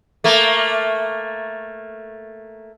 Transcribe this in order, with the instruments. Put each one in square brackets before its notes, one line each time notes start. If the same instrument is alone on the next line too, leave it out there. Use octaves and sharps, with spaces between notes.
[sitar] A3 A#3